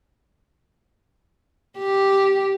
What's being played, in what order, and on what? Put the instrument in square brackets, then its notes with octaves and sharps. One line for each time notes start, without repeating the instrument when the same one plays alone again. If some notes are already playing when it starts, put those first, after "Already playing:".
[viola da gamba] G4